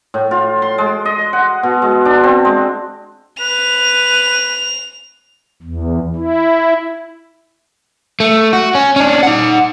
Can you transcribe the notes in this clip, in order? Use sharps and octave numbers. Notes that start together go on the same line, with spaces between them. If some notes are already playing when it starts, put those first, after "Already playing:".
A2
F4
C6
G#3
D#5
F#5
B2
G#3
D4
C4
G#3
B4 F7
E2
E4
A3
F#4
C#4
C#4 D4
D#4 F#5